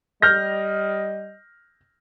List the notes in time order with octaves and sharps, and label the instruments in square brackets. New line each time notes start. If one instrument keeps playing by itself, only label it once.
[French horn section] G3 D#5 [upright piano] F6 G6 A#6